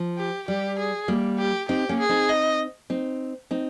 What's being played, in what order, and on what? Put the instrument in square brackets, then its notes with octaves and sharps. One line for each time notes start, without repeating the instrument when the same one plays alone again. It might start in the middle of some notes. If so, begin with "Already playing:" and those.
Already playing: [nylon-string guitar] F3
[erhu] G4
[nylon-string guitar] G3 [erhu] G4
[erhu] G#4
[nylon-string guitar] G3 A#3
[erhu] G4
[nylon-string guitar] C4 D#4 [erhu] G4
[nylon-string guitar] A#3 C#4
[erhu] G#4
[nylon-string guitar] C4 D#4
[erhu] D#5
[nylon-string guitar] C4 D#4
C4 D#4